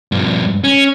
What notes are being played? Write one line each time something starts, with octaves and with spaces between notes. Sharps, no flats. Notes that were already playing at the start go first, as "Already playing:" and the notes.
G2 F3
C#4